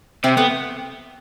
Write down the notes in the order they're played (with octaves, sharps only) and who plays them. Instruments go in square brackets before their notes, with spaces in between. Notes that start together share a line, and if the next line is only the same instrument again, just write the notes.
[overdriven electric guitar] C3 [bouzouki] C4 E4
[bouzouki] A3 C4 [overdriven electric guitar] B3